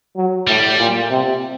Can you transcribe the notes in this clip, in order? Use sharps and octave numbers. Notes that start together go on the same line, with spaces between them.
F#3
A2 G3
A#2
C3